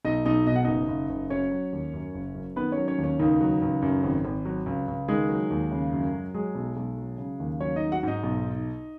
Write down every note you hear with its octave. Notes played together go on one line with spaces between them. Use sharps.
B1 D#4 D#5
B1 D#4 D#5
B2 D#5
F#5
F#1 D#4 D#5
F#1
F#1
F#3 C#4 C#5
F#3
D#2
F#2
F#1
F#2
D#3 B3 B4
C#4 C#5
F#3
C#4 C#5
D#2
C#4
C#2 D#3 D#4
F#3
C#2
F#2
G#1
G#1
F#3
C#2
C#2
D#3 G#3 G#4
F#3
D#2
C#3
F#2
F#3
F#3 G#3 G#4
B1
B1
F#3
C#3
D#2
F#3 C#4 C#5
D#4 D#5
F#3
F#4 F#5
G#2 D#4 D#5
B1